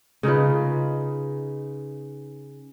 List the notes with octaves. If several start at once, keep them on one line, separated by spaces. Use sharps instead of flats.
C#3 D#4 F4 B4